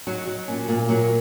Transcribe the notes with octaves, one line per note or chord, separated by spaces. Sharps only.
F#3 D#4
F#3
A#2 C#4
A#2 A#3
F#3 A#3